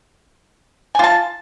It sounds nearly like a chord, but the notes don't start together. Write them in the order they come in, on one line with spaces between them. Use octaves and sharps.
G#5 F4 A5